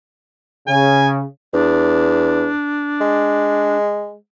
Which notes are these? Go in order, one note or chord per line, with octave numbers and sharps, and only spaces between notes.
C#3 G#5
E2 D4
G#3